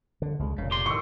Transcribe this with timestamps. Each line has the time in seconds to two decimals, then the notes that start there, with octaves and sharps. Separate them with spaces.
0.22 D3
0.39 C#2 G3 G#3
0.58 F1 A#2 C#3
0.71 G4 C6
0.86 A2 D3 D#3 C#6 E6